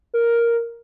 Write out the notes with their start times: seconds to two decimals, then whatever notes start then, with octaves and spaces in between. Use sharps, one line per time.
0.14 A#4